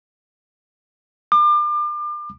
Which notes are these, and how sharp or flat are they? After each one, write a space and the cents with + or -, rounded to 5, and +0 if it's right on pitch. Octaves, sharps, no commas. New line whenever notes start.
D6 +35